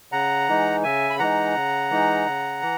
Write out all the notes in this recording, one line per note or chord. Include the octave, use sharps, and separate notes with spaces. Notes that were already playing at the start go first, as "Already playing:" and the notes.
C#3 F#5 A#5
E3 G#3 D#4
C#3 E5 G#5
B5
E3 G#3 D#4 F#5 A#5
C#3
E3 G#3 D#4
C#3
E3